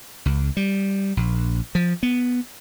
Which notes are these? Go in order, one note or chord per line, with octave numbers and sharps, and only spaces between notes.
C#2
G3
A#1
F3
B3